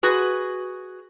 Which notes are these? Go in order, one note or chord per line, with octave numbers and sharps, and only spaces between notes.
F#4 G#4 B4